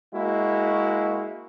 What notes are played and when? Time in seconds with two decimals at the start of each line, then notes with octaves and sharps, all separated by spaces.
0.14 G#3 A#3 E4 F#4